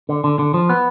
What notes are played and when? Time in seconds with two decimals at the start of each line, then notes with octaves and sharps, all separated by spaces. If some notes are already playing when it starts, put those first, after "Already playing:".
0.09 D3
0.24 D3
0.39 D3
0.54 F3
0.69 B3